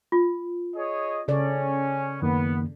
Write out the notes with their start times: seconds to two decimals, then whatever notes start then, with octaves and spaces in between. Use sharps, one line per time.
0.12 F4
0.76 G#4 C#5 D#5
1.28 C#3 C#4 A4 D5
2.22 F#2 D#3 A#3 B3